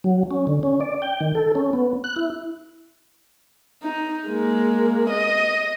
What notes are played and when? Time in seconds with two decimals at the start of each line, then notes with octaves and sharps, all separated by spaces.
0.04 F#3
0.31 C#4
0.47 D3
0.63 C#4
0.81 D5
1.02 G5
1.20 D#3
1.35 A4
1.55 C#4
1.73 B3
2.04 F#6
2.16 E4
3.82 D#4
4.28 G#3 A#3
5.10 D#5